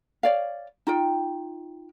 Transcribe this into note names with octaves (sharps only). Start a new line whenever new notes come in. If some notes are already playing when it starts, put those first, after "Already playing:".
C#5 D5 F5
D#4 F4 G5